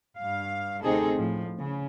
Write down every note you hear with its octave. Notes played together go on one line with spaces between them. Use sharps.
G2 F5
D2 C3 C4 D#4 G#4 A4
A2 F3
C#3